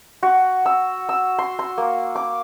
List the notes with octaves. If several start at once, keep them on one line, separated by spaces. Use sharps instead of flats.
F#4
E6
E6
C6
C6
A#3
D6